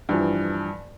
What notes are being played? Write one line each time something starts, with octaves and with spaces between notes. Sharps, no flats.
G2 E3 F3